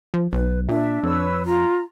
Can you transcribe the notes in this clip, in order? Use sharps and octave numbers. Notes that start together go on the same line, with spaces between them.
F3
B1 B4
A#2 D4 E5
F2 B4 C#5 E6
F4 A#5